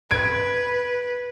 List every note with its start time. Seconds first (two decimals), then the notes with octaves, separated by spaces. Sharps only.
0.11 B4 G#6 D7